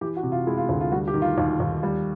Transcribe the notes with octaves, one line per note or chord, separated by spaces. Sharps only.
E3 G4
F#4
C3
F4
G#3 E4
F4
D2 F4
F4
G3 F#4
G4
D#3
F4
D#2
D#2
G3